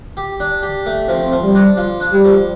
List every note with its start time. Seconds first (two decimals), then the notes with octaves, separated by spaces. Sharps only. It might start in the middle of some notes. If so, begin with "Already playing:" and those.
0.17 G4
0.40 D4
0.63 G4
0.86 A3
1.08 F3 C4
1.32 F3
1.43 G3
1.55 D4
1.77 F3
2.00 D4
2.13 G3
2.24 F3